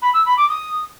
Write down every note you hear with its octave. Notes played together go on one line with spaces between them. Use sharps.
B5
E6
B5
D6
D#6